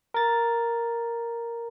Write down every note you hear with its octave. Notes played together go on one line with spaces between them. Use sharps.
A#4 A6